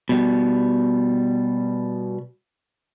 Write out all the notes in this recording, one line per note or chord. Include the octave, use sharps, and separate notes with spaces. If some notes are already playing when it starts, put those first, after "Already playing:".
B2 G3